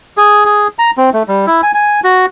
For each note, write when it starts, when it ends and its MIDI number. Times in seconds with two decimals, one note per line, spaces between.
0.17 0.45 68
0.46 0.68 68
0.79 0.91 82
0.98 1.10 60
1.13 1.23 57
1.28 1.46 55
1.47 1.61 64
1.63 1.72 80
1.74 2.00 80
2.04 2.26 66